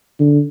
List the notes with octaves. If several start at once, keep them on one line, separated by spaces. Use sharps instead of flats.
D3